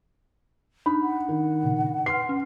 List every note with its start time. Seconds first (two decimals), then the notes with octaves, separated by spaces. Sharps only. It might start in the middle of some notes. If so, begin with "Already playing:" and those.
0.86 D4 D#4 B5
1.02 F#5
1.29 D#3
1.63 A#2 C#3
2.06 B4 C6 F6 C7
2.29 C#4